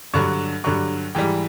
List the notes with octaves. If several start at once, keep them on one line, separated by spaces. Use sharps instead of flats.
G2 D3 F#3 C#6
G2 D3 F#3 C#6
G#2 E3 G3 G5